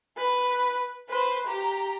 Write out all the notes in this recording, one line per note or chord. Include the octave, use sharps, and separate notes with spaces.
B4
B4 C5
G4 A#5